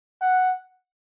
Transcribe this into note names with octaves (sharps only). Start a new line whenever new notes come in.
F#5